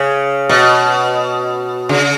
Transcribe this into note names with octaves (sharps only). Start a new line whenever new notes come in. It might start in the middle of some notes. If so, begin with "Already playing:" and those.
Already playing: C#3
B2
C#3